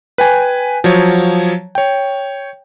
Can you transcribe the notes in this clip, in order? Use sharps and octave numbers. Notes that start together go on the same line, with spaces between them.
B4 G5 G#5
F3 F#3 C#5
C#5 G5